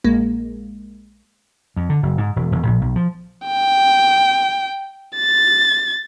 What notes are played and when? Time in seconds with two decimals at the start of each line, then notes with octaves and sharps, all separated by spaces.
0.04 A#1 G#3 A#3
1.76 F2
1.89 D3
2.03 F#1
2.18 G#2
2.36 E1
2.51 E1
2.66 A#1
2.81 B1
2.96 F3
3.46 G5
5.16 A6